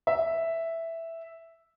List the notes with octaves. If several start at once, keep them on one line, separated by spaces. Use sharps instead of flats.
E5